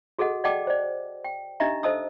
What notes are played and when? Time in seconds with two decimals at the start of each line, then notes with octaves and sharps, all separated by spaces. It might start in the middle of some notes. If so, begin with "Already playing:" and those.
0.19 F#4 G#4 A4 D#5 F#5
0.44 D5 D#5 F#5 G5 A5 D6
0.67 C5 D5
1.24 G5
1.60 D4 D#4 G4 D#5 E5 A#5
1.83 A4 C5 D#5 A5 D#6 E6